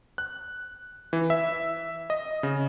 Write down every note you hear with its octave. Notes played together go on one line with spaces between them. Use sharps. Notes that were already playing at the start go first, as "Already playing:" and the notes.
F#6
E3
E5
D#5
C#3